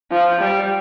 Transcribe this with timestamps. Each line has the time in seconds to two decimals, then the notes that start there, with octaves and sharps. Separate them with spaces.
0.11 F3
0.41 G3